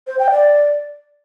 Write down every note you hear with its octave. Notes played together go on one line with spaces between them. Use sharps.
C5
G5
D5